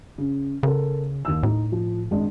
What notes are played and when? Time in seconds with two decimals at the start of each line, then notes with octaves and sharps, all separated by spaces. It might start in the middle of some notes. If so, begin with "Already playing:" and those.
0.18 C#3
0.63 C#3 A4 A#4
1.25 D#2 E6
1.43 A2 D#4
1.72 F3
2.11 G#1 G#3 D4